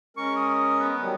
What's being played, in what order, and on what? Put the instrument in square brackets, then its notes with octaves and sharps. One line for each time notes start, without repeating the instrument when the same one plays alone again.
[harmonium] G#3 C#4 A#4 [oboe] C#6
[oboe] D#6
B3
[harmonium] D#3 F#3 G3